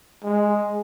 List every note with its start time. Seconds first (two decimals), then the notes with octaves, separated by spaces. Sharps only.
0.23 G#3